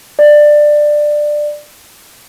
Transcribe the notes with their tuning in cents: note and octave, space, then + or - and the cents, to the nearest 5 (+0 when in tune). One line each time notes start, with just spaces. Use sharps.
D5 +15